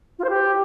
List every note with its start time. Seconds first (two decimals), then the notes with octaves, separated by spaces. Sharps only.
0.18 F4
0.24 C5
0.29 G4